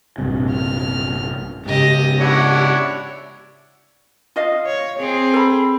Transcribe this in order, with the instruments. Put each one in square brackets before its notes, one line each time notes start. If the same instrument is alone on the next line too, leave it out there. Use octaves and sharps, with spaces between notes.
[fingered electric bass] A#1 G2 C3
[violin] F6
[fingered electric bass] G#2 C#3 [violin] G4 D#5
[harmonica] D4 E4 C#5 [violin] G4 F#5
[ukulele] F4 D#5 F5
[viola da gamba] C#5
C4 G#4
[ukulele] A4 B5